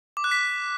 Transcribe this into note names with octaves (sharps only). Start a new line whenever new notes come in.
D6
F#6
B6